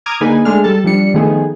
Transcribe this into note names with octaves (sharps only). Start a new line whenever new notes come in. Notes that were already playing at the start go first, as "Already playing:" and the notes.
A#5 D6 D#6 F6 G#6
D3 A#3 D#4 G#4 B4 G#5
G#3 A3 D4 G#4 F6
G3 A4 A5
F3 G3 D4 C#7
D#3 F3 A3 B3 G#4